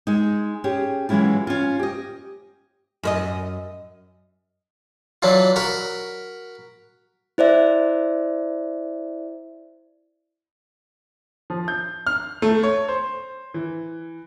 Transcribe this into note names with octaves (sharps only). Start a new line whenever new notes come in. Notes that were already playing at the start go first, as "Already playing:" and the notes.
G#3 D#4
C#4 G4 G#4
E3 F#3 G#3 C#4 E4 F4
C#4 F4
G4 D#5
F#2 B4 D#5
E3 F#3 D4 E4 F4
F#4 A#4 A#5 B5
E4 C5 D5 E5
F3
G6
F6
A3
C#5
C5
E3